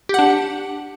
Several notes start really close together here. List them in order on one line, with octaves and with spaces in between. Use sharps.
G4 F#5 D4